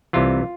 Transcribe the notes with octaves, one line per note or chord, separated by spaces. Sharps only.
C2 C3 E3 F4